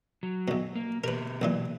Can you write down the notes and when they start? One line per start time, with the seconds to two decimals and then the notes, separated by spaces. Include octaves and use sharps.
0.23 F#3
0.48 B1 B2
0.75 A#3
1.04 B2 G4 A#4 B4
1.42 B1 A#2 E3